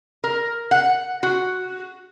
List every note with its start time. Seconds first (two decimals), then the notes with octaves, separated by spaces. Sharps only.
0.24 A#4
0.71 F#5
1.23 F#4